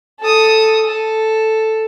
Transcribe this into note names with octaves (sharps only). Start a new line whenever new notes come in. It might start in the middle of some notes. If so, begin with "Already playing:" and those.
A4 D#6
A4